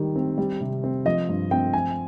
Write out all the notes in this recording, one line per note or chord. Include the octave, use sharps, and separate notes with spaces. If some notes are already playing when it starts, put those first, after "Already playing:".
Already playing: D#3 G3
C4
G3
C3
C4
F3 D#5
G2
C4 G5
F3 G#5